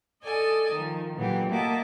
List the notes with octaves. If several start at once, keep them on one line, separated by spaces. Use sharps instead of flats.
A4 D5 D#5 G#5 A5
D#3 F3
A#2 D3 E3 F#3 B3 G4
A#3 F#4 D#5 E5 A5 D6